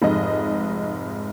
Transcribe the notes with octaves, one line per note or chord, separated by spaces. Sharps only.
F1 G#2 D#5